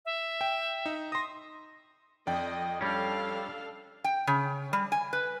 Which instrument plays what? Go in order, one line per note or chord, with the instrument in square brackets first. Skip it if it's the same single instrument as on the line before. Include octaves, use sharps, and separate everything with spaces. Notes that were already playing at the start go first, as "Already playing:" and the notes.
[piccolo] E5
[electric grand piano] G5
D#4
[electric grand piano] C6 D#6 [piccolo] A#6
[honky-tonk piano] F2 [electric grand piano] D5 G5 [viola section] D#5
[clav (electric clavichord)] G3 C#4 [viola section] D4 A4 F5
[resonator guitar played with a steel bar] G5
C#3
G3
G#5
B4